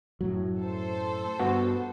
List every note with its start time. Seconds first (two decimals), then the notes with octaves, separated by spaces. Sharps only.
0.21 F#2 A2 F#3
0.58 A4 C5
1.39 G2 B3 F#4